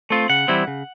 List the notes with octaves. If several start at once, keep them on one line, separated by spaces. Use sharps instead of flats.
A3 C4 F4
C#3 F#5
E3 G3 C4 E4
C#3